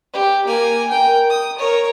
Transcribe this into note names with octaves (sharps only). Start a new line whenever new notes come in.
G4
A#3 G#5
A#4 G5
D#6
A#4 C#5